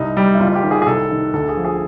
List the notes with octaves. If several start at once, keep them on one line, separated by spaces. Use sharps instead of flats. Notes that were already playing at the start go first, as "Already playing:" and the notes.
Already playing: C2 D#4
G3
E4
F#1 F4
G4
D#3
G#4
G#4
C2 A4
D#3
D2 A4
G#4
F3
G#4